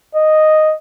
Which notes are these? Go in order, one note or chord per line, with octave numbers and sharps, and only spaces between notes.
D#5